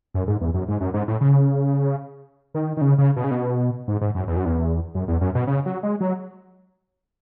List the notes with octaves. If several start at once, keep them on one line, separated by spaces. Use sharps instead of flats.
F#2
G#2
E2
F#2
G#2
F#2
G#2
A2
C#3
D#3
D#3
C#3
C#3
B2
C#3
B2
G#2
G#2
F#2
E2
F#2
E2
F#2
E2
F#2
B2
C#3
F#3
G#3
F#3